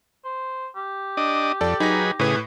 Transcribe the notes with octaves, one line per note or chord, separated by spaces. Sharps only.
C5
G4
D4 D#5
F2 A4 D5 A5
F#3 D#4 G#4 B4 A#6
A2 C#3 G#4 B4 D#6